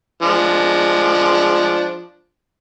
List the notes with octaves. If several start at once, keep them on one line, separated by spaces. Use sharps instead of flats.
F3 G#3 D4